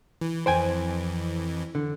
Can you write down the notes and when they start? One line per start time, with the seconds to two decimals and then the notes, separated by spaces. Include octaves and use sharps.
0.21 E3
0.46 F2 E3 C5 G5 G#5
1.75 D3